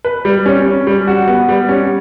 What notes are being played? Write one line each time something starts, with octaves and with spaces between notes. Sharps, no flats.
B4
G3
C#4
C#4
G3
F#4
B3
G3
C#4